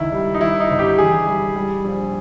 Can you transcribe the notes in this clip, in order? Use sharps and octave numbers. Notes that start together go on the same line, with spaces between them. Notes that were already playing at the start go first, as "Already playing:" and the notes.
Already playing: C#2 D#3 E4
G3
D#4
D#3 E4
D#4
G1
G4
E3 G#4
G3
G3
A#1